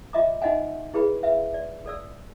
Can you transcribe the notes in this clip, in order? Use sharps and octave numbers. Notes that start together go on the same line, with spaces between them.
F4 D#5 E5 A#5 D6
D#4 F4 D#5 E5 F#5 G#5
E4 G#4 B4 B5
B4 E5 F5
D5
A4 D5 E6